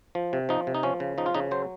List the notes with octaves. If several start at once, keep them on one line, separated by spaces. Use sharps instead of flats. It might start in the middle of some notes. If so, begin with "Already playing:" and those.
F3
C3
F3 D#4
C3
D#4
F3 C#4
C#3
F3 D#4
F4
C#3 D#4
F#3 C5